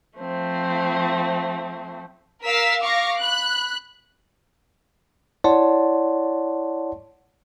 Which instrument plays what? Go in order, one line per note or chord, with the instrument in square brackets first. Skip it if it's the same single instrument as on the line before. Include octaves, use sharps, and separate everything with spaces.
[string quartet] F3 A3 C4
[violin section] A#4 F5 E6 B6
F5 C#6 D6 A#6
B5 F#6
[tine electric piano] E4 C#5 D5 F#5 A5 C6